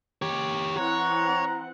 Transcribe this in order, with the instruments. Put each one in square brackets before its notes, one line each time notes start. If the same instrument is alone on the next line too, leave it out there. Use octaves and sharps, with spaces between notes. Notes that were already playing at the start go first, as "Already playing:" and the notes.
[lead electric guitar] G4 C#5
[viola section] E3 C4 F#5 [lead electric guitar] C#5 [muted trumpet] A#5